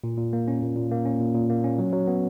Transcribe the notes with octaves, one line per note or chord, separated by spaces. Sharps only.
A#2
A#2
A#3
C#4
A#2
A#2
A#3
C#4
A#2
A#2
A#3
C#4
F#3
F#3
B3